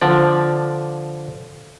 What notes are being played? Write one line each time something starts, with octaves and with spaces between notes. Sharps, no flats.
D3 F3 D5